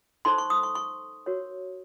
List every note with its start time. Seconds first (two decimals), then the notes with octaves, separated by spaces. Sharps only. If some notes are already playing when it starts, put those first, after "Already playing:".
0.25 D#4 A4 C5 C6
0.38 C#6
0.50 D#6
0.63 C#6
0.75 C#6
1.26 F#4 A#4 C#5